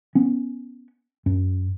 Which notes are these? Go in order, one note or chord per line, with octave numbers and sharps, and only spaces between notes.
B3 C#4
F#2